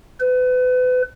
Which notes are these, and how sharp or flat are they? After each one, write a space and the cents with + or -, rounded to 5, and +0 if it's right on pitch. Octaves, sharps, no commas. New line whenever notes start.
B4 +35